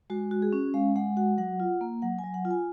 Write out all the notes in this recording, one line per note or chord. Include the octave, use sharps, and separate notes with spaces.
G#3 F#4
F#4
G#4
C#4
G#3 F5
G#3 F#5
F#4 F#5
F#3 F#5
F4
A#3
F#3 F#5
G#5
F#3
F#5
F4
G#5